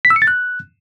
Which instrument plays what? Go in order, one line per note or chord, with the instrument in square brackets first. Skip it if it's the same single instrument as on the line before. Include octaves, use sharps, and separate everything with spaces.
[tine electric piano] B6
E6
C#7
A6
F#6